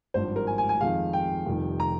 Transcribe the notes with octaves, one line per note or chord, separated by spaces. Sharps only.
G#1 G2 F3 C5
A#4
G#5
G#5
G#5
F2 D#3 G#3 F5
G5
F1 F2 D#3 G3
A#5